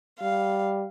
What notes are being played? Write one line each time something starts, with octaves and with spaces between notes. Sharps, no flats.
G3 F5